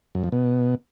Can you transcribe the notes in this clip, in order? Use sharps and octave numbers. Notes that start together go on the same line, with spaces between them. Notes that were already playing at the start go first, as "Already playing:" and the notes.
F#2
F2
B2